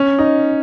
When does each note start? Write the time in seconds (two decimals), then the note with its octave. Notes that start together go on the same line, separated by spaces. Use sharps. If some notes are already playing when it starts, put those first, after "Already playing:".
Already playing: C#4
0.18 D#4